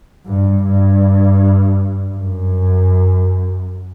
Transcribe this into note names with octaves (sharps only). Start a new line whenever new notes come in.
G2
G2
F#2